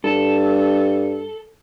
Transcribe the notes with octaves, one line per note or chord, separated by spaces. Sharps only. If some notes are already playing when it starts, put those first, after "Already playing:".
G2 A4